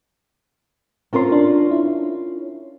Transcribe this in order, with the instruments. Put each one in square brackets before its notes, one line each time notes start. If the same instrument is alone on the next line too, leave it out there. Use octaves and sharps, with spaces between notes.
[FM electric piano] C4 C6 [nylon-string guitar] C#4 F4 A#4
[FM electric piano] D4
E4